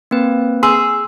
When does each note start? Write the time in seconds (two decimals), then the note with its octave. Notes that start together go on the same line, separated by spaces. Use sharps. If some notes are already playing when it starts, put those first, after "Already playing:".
0.11 A#3 C4 B4
0.63 G#4 C6 E6